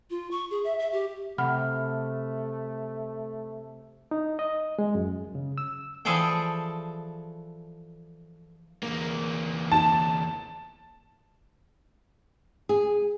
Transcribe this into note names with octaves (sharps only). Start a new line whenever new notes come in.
F4
C#6
G#4
E5
E5
G4
C3 A3 F#5 B5 F6
D#4
D#5
G#3
F#2
C#3
E6
E3 F3 G#4 A4 D5 G5
E2 A#3
A5
G#4